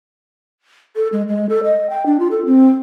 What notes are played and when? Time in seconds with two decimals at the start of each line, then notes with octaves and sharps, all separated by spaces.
0.96 A4
1.12 G#3
1.28 G#3
1.49 A4
1.64 D#5
1.90 G5
2.06 D4
2.19 F4
2.31 A4
2.46 C4